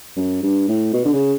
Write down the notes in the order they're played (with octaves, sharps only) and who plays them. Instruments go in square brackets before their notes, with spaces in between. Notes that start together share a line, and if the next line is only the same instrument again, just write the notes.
[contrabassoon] F#2
G2
A2
B2
D3
C#3